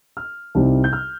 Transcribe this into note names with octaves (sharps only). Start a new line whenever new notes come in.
F6
C2 C3 G3 C4 D#4
G6
F6